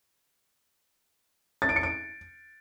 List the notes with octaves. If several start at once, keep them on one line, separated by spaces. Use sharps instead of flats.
A6
D7
C#7
D7